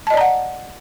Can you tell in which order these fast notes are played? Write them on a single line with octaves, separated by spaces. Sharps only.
A5 D#5 D5 A#5 F#5